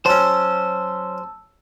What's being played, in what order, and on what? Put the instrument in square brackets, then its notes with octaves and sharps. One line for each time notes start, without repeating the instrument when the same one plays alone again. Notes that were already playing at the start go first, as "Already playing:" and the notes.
[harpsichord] F#3 C#4 [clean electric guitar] C5 [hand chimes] A5 E6